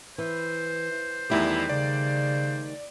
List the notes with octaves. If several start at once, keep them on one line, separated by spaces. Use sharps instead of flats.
E3 C5
E2 D#3 G3 A3 E4 G4
C#3 D5